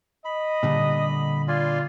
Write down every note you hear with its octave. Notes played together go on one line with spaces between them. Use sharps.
D#5 B5
A#2 D3 G3
F4 D5 G#5 C6